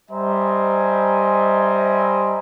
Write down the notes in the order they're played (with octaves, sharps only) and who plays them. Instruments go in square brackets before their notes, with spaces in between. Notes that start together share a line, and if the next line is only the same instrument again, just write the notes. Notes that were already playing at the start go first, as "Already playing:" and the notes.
[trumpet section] G3 C5 D#5 E5 G#5 A#5